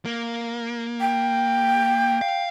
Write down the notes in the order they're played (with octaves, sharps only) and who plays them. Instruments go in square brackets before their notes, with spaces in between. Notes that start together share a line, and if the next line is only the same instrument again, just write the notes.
[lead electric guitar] A#3
[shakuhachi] G5
[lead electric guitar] F5